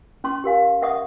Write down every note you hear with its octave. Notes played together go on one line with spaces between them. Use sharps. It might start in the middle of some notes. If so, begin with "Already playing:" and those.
C#4 C6 C#6
G4 A#4 F5 G#5
A#4 D#5 E5 F#5 C#6 D#6